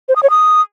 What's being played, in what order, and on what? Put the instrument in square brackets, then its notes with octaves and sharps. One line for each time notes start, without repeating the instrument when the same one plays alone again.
[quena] C5
D#6
C#5
D#6